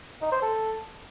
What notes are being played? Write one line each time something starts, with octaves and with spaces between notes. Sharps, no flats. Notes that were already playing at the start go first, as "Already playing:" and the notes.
D#4
C5
A4